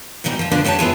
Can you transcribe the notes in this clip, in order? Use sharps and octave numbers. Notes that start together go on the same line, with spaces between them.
G#2 B2 E3 G3 D#4
F3 F4
D3 F3 B3 D4
G4 B4 C#5 G#5 A5
B3 E4 F4 G#4